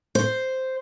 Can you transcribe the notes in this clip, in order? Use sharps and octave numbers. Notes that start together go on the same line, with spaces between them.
C5